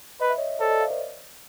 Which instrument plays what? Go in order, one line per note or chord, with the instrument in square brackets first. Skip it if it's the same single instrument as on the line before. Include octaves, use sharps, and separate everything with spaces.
[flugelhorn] B4 [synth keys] D#5
[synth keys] E5
C#5 D#5
[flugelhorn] A4 [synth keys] C5 D5
[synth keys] C#5 D#5
D#5 F5
A#4 C5